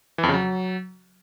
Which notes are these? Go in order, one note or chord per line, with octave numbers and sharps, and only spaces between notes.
E3
F2
C#3
F#3